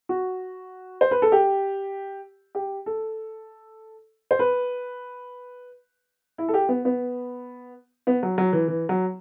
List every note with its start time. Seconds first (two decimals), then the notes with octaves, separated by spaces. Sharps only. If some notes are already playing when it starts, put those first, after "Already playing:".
0.09 F#4
1.01 C5
1.11 B4
1.22 A4
1.32 G4
2.55 G4
2.86 A4
4.31 C5
4.39 B4
6.38 E4
6.48 A4
6.54 G4
6.69 B3
6.85 B3
8.07 B3
8.23 F#3
8.38 F#3
8.53 E3
8.68 E3
8.89 F#3